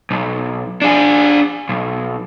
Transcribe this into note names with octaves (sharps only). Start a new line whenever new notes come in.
B1
D4 G#4
B1